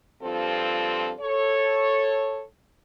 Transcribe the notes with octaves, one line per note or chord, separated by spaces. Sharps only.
G2 F3 C4 F4 A4
A4 C#5